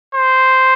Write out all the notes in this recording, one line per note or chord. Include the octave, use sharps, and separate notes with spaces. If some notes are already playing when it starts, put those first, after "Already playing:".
C5